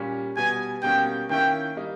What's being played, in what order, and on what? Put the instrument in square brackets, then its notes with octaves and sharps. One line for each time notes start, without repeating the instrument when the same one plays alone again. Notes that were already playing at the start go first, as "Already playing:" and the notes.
Already playing: [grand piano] A#2 G3 C#4
[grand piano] B2 G3 B3 [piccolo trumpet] G#5
[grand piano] B2 G3 A#3 C#4 [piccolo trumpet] G5
[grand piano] D#3 A#3 C#4 E4 [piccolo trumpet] G5
[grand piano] G3 A#3 D#4